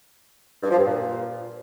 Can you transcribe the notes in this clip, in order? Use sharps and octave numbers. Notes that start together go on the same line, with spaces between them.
G2
F3
G2
A#2